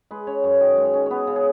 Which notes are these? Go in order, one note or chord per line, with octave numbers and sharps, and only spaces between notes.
G#3 B4
C#4 C#5
F#2 C#5
D#3 D#5
G#3
C#5
C#4
B3 B4 C#5
C#3
G#4